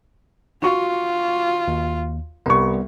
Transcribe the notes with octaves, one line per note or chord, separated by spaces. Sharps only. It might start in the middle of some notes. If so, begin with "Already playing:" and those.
F4 F#4 C#6
D#2
C2 G3 B3 C#6